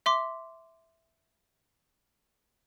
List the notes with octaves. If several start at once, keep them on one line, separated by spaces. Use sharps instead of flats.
E5 C6 D6